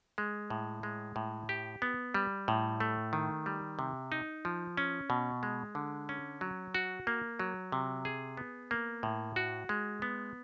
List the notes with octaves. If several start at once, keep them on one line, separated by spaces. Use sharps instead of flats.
G#3
A2
G#3
A2
G4
B3
G3
A2
A3
D#3
G3
C3
D#4
F3
C#4
B2
G#3
D3
C#4
F#3
F#4
A#3
F#3
C3
G#4
B3
A#3
A2
F#4
G#3
B3